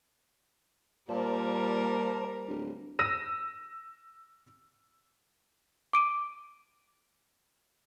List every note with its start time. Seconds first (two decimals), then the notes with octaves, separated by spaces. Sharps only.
1.09 A#2 G3 A#3 A#4 C5 A5
2.47 D1
2.99 E6 A#6 D#7
5.93 D6 D7 D#7